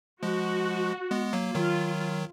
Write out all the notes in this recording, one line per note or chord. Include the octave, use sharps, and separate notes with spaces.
F3 G#3 F#4
G#3 B3
F#3 A#3
D#3 F#3 F4